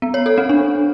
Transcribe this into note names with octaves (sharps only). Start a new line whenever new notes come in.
B3
C#5
A4
C4
D4